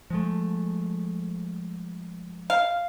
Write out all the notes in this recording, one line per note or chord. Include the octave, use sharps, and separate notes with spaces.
F3 G#3 A3
F5